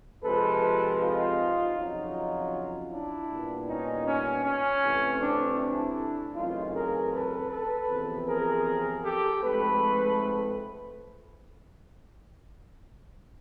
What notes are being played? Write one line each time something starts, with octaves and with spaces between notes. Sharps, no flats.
C3 F3 G#3 C4 A4 B4
D#4 F4
F2 C#3 F#3 D#4 F4
D4 E4
A#2 G3 B3
C#4 D#4
C#4
C#4
C3 E3 A3
C4 D4
D4 E4
F#2 C#3 E3 A3 C4 D#4 F4
G#4 A#4
A4 B4
A4 B4
E2 C3 F3
G#4 A#4
G4 A4
G#2 F3 A3 C4 A4 B4